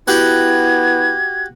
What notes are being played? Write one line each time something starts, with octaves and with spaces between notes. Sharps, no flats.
B3 E4 F#4 G4 F#5 G#6